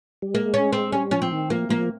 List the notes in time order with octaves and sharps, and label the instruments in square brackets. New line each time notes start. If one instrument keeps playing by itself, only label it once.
[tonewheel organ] G3
[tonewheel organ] G#3 [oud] A#3
[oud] C#4
C4
[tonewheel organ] G3 [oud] C#4
[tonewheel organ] F3 [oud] C#4
[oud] C4
[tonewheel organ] D#3
[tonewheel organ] F3 [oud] A#3
[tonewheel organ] F3 [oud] A#3